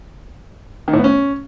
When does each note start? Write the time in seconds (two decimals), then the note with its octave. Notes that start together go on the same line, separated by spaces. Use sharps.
0.88 D#3
0.93 A2
0.99 B3
1.04 C#4